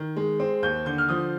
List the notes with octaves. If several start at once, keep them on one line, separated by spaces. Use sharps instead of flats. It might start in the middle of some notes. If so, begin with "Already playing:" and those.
Already playing: D#3
G#3
C4
D#2 G6
D3 G6
F6
F3 D#6